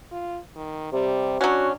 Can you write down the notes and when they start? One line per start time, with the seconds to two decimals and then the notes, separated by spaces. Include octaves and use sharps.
0.12 F4
0.56 D#3
0.93 C3 G3
1.41 F#3 C#4 D4 F#4